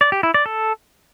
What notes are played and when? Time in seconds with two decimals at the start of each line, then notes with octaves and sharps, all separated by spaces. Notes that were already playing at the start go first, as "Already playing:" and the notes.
0.01 D5
0.12 G4
0.23 E4
0.34 D5
0.46 A4